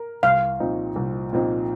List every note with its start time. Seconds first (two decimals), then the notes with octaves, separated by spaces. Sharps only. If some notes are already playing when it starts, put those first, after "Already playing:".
Already playing: A#4
0.23 C2 F5
0.60 A#2 F3 C4 D#4
0.96 C2
1.33 A#2 F3 C4 D#4